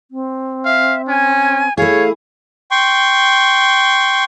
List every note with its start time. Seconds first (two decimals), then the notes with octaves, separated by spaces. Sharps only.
0.11 C4
0.65 E5 F5
1.08 C#4 G#5
1.78 A3 E4 G#4 C#5 F5
2.71 G5 C6 C#6